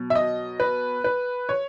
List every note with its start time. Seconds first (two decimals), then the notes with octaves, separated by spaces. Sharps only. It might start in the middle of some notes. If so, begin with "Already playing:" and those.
Already playing: B2 F#3
0.10 E5
0.15 D#5
0.60 B4
1.04 B4
1.49 C#5